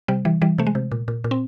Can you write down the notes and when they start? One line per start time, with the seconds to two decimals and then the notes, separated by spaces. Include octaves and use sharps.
0.08 C3 G3
0.25 E3 G3
0.42 E3 G3
0.58 C3 A3
0.67 G#3
0.75 C3
0.92 A#2
1.08 A#2
1.24 A#2
1.31 C4